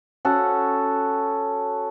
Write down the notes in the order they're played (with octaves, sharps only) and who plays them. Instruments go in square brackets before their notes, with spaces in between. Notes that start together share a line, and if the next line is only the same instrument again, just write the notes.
[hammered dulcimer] C#4 F#4 A4 F#5